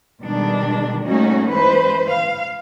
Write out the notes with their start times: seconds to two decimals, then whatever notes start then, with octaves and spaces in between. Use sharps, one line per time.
0.20 B2 D#3 G3 G#3 D4
1.05 G3 A3 A#3 C#4 D#4 F#4
1.49 E3 G#3 B4 C5
2.10 F5